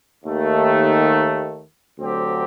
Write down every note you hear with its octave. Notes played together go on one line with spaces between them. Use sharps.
D#2 D#3 A3
D2 D3 F#3 C4 G4